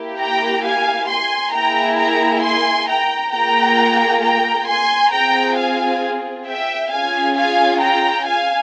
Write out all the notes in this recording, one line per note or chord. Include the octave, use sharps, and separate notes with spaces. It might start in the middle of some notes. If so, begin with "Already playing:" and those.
Already playing: A#3 E4 G4
G5 A#5
F5 G#5
G#5 C6
A#3 E4 G#4 G5 A#5
G5 A#5
G#5 C6
G5 A#5
A#3 F4 G#4 G5 A#5
G5 A#5
G#5 C6
C4 F4 G#4 G5 A#5
F5 G#5
E5 G5
C#4 F4 G#4 F5 G#5
F5 G#5
G5 A#5
F5 G#5